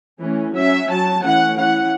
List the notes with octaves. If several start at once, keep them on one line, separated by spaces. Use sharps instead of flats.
E3 A3 C#4
F#3 C#4 E5
F#3 C#4 A5
E3 A3 C#4 F#5
E3 C#4 F#5